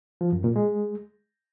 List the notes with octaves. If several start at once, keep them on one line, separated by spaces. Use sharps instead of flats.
F3
F#2
A#2
G#3